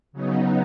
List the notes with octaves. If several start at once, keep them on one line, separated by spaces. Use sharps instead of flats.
C#3 F#3 B3 D#4